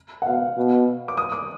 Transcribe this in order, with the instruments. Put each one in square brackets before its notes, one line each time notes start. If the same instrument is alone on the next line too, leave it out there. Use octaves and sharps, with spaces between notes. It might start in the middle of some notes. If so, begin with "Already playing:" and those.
[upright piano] F#5
[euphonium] B2 [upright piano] F5
[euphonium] B2
[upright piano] D6
D#6
D6